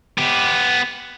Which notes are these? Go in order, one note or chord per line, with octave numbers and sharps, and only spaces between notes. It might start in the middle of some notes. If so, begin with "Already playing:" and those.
B3 G4